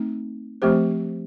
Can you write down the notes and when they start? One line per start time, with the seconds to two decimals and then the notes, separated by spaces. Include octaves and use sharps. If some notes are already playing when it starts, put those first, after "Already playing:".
Already playing: A3 C4 D#4
0.62 F3 A3 C4 G4 C5